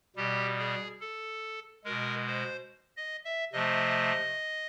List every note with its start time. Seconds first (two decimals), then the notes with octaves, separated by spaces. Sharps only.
0.16 B2 G3 G4
0.58 G#4
1.00 A4
1.84 B2 G#3 A#4
2.27 C5
2.97 D#5
3.25 E5
3.53 C3 F3 A3 D#5